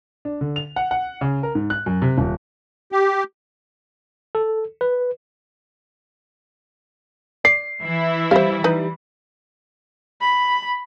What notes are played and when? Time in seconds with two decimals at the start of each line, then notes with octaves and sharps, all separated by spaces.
0.25 D4
0.41 D3
0.56 F7
0.76 F#5
0.91 F#5
1.21 C#3
1.43 A#4
1.55 G#2
1.70 F#6
1.86 F#2
2.02 C3
2.18 D#1
2.92 G4
4.35 A4
4.81 B4
7.45 D5 C7
7.82 E3 E4 E5
8.31 G3 C5 F5
8.64 E3 D#4 B4
10.21 B5